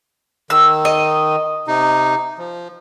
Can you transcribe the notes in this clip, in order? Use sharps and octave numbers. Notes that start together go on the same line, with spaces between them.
D#3 E6
D#5
C3 D#4
F3